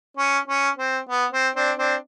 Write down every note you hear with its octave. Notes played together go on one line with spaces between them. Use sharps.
C#4
C#4
C4
B3
C4
C4 D4
C4 D4